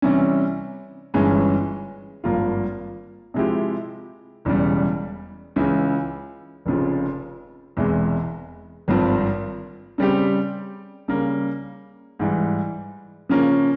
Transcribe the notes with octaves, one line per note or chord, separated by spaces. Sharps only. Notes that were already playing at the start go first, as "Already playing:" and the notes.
C3 E3 G3 C#4
G1 G2 E3 G#3 C#4
G#1 G2 F3 A#3 F4
C3 F3 G#3 E4 G4
E1 E2 C#3 G3
C#2 C#3 E3
F1 F2 C#3 F3
E1 E2 C3 E3 G#3
G#1 G2 F3 C4
C#3 G3 C4 G4
C#3 G3 A#3
G#2 E3 G3
C#3 F3 A#3 C#4